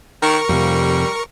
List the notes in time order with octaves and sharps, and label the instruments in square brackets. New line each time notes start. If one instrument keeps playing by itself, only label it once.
[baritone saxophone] D#3 [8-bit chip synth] A#4 C#6
[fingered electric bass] F2 C3 [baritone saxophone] G3